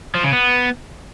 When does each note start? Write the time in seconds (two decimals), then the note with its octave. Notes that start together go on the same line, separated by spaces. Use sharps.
0.15 F3
0.24 C#3
0.33 B3